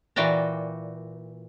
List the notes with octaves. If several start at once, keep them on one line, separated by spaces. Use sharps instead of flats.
A#2 E3 F#4 D5 G5 A#5